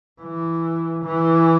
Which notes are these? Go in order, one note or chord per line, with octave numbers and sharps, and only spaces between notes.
E3
E3